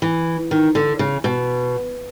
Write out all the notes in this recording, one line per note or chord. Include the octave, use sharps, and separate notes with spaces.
E3
D#3
D3
C#3
B2